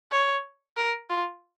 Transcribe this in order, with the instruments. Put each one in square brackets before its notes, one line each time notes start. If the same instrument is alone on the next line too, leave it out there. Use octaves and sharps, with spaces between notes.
[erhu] C#5
A#4
F4